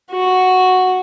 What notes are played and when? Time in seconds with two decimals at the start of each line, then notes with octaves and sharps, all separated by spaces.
0.11 F#4